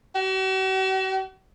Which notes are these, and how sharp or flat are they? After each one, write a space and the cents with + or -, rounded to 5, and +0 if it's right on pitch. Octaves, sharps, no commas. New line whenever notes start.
F#4 +45